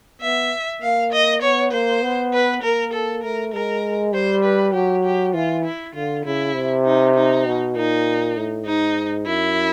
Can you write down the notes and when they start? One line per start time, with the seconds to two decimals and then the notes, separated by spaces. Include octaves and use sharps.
0.22 B3 E5
0.82 A#3 F5
1.13 D#5
1.42 B3 C#5
1.72 A#3 C5
2.03 B3
2.33 B4
2.63 A#3 A#4
2.94 A4
3.23 A3 A#4
3.53 G#3 A#4
4.13 G3 C5
4.44 B4
4.74 F#3 G4
5.04 G4
5.34 E3 F4
5.65 E4
5.95 D3 F4
6.25 C#3 E4
6.55 C3
6.86 D#4
7.16 D#4
7.46 B2
7.76 A#2 D#4
8.37 A2
8.66 G#2 D#4
9.27 F#2 E4